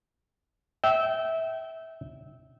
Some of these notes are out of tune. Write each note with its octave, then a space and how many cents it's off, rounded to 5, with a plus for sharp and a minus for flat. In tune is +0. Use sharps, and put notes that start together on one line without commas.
E5 -20 G5 -25